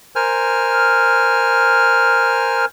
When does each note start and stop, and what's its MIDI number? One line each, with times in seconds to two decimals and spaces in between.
0.16 2.65 70
0.16 2.65 72
0.16 2.65 80
0.16 2.65 89